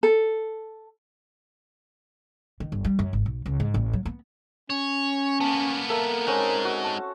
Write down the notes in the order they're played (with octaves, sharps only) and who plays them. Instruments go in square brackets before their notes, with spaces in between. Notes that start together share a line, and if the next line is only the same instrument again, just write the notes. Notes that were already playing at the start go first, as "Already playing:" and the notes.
[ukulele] A4
[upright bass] D#3
G1
G3
F#2
G#1
B1
C#2
G#2
A1
F#3
B3
[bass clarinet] C#4 [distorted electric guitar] C#5
[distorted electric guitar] A#3 B3 [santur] A5
[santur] A4 E5 F5 [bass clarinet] A#4
[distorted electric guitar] G#3 D#4 [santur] C4 C#4 F#5
[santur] F#4
A5 C#6